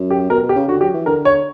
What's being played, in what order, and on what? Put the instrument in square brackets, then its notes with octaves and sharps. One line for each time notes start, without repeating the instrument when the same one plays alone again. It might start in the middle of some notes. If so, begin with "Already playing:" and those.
Already playing: [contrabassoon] F#2
[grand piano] G4
[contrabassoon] B2 [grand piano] A#4
[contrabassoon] B2
[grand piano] G4
[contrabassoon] C#3
[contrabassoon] D3 [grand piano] F#4
[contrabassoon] F#3 [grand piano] G4
[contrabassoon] E3
[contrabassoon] D3 [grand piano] A#4
[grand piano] C#5